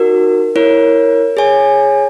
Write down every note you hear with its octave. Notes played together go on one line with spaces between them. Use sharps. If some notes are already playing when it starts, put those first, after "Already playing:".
Already playing: D#4 F#4 A#4
E4 A#4 C#5
G#4 C#5 G#5